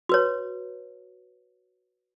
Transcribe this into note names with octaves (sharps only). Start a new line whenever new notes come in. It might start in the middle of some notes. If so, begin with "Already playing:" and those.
F#4 B4 C#5